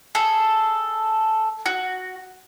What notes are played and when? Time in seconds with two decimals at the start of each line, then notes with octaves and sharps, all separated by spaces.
0.15 G#4 A4
1.66 F#4